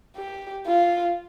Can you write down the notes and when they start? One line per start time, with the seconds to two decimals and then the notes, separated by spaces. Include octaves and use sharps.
0.16 G4
0.67 F4